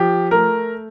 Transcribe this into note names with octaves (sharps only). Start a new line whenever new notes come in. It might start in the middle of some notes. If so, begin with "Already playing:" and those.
Already playing: F3 G4
A3 A#4